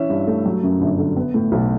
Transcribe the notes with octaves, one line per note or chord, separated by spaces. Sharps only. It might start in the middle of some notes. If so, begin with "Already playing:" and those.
Already playing: E3 C#4 E5
G2
A3
F#3
F#2
G1
D3
B3
A2
B1